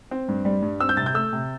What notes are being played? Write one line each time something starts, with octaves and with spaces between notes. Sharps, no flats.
C4
G2
G3
G2
C4 E6
G6
C3 A6
G6
A3 E6
C3